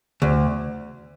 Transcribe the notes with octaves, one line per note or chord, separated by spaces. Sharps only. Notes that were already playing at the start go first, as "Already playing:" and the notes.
D2